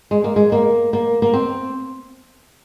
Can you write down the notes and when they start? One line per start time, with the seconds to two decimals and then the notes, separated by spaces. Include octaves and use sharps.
0.11 G#3
0.24 A#3
0.36 G#3
0.52 A#3
0.93 A#3
1.22 A#3
1.34 C4